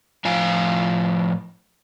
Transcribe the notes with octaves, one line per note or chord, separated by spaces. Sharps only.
A2 F3 F5 G#5